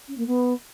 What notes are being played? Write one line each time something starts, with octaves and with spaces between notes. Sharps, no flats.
C#4
A#3
B3